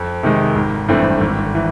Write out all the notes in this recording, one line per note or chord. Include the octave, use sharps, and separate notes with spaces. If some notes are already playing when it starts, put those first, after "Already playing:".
Already playing: F2
C3 D#3 G#3
G#1
G2 E3 A3 C4
G#1
E3